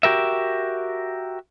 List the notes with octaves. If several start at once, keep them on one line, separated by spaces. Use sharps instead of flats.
F#4 G4 A#4 E5